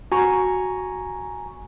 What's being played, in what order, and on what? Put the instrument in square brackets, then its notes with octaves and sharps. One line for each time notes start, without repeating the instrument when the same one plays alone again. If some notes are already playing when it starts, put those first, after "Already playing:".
[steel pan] F#4 [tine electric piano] G#5 A#5 C#6